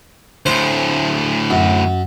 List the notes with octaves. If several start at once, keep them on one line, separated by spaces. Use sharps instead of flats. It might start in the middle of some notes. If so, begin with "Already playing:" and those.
D2 A2 C5
F#2